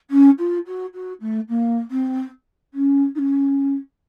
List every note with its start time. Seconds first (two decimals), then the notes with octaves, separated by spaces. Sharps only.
0.10 C#4
0.38 F4
0.66 F#4
0.94 F#4
1.21 A3
1.49 A#3
1.91 C4
2.74 C#4
3.15 D#4
3.18 C#4